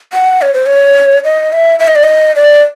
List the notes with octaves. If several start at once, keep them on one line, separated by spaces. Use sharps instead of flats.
F#5
C#5
C5
C#5
D#5
E5
E5
D#5
D5
D#5
D5